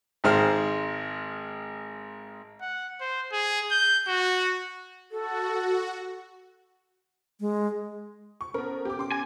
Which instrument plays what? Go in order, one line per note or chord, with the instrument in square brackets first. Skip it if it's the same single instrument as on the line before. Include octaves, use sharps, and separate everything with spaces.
[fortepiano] G#1 D#3 G#3 C5 F6
[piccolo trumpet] F#5
C5
G#4
G6
F#4
[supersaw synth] F#4 [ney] A4
[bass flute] G#3
[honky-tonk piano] C#6
[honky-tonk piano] B3 A#4 [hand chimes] C#4 A4 C5
[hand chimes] B3 [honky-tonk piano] G4 D6
[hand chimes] C#4 [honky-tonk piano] C6 D6
[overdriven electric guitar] G#5